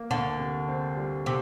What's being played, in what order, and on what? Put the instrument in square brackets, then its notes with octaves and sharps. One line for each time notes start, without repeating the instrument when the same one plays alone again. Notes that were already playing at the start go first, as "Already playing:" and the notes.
Already playing: [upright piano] A#3
[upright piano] D2 [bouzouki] D3
[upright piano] C3
C4
G3
[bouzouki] C3